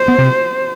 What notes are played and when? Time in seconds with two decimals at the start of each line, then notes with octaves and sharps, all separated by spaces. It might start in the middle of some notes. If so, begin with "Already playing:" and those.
Already playing: C5
0.08 B3
0.18 C3